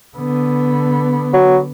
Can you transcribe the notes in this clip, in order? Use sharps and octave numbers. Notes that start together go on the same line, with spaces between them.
D3 B3
F#3